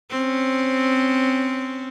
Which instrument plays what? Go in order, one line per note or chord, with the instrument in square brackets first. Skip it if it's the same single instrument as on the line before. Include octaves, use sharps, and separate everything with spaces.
[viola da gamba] C4 C#4